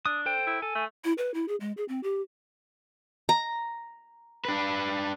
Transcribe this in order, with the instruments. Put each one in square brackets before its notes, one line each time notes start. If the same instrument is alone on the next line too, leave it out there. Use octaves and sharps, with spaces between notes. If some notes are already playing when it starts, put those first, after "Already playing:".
[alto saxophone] D4 [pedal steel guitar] D#6
[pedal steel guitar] A4 C5 G5
[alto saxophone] E4
[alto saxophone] A4 [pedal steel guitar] G#5
[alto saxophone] A3
[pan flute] E4
B4
E4
G#4
G#3
G#4
C4
G4
[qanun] A#5
[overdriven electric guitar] D4 B4